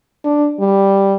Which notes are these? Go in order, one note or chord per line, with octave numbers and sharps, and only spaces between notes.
D4
G3